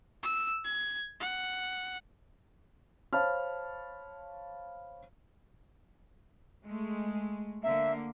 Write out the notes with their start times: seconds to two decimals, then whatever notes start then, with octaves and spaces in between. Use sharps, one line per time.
0.23 E6
0.65 G#6
1.20 F#5
3.13 C5 C#5 F5 A5 B5 F6
6.66 G#3 A3
7.63 D3 A#3 E5